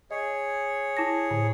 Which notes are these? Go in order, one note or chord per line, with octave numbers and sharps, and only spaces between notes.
G#4 C#5 D#5
E4 A5 A#6
A2 D3